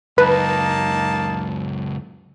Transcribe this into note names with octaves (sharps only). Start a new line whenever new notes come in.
C#2 F#2 A#3 D#4 B4 A5